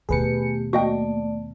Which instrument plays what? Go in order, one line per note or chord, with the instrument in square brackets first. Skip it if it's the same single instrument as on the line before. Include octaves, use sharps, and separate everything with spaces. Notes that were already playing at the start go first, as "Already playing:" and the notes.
[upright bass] D#2 B2 [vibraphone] A3 G4 [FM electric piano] G#4 B4 C#7
[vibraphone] A3 D5 A5 [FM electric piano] A#3 [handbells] F#4 D#5 G5